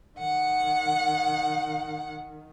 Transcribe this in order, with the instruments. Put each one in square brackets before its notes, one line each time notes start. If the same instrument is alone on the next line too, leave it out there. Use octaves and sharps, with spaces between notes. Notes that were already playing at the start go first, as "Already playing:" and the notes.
[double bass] D#3 [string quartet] F#5